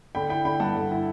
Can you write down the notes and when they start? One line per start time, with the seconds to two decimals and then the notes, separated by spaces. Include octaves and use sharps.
0.15 D3 G5 B5
0.29 E4 G5 B5
0.45 D3 G5 B5
0.60 G2 F#5 A5
0.75 D3
0.91 E4